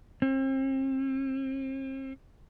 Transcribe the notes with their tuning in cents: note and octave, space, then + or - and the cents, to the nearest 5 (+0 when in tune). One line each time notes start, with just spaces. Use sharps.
C4 +40